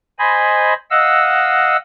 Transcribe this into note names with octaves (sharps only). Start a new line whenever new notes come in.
C5 D#5 G#5 B5
D#5 F5 F#5 E6